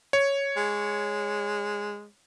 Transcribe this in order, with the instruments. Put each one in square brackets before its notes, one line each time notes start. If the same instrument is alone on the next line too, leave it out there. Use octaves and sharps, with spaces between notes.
[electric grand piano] C#5
[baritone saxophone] G#3